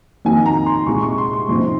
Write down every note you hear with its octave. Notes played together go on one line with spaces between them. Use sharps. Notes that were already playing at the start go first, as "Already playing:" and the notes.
F2 D#3 F#3 A#3 D#4 G#5
A#5
C6
C2 A#2 G#3 C#6
C#6
C6
C6
F2 C3 F3 C4 D#4